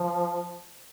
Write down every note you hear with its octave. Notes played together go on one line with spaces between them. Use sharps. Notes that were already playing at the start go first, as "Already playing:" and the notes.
Already playing: F3